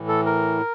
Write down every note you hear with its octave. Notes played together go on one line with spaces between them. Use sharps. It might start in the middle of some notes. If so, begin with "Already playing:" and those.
Already playing: A2 E3
A4
A#4